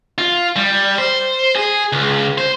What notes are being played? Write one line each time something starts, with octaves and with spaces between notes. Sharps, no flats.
F4
G3
C5
G#4
C#2
C5